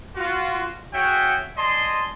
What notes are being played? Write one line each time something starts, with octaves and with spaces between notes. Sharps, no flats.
F4 F#4
F#4 G#4 C#5 E5 F#5 G5
D5 D#5 G#5 A5 C6